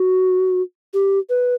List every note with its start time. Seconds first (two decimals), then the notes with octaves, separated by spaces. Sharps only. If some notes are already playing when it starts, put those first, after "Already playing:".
Already playing: F#4
0.94 G4
1.29 B4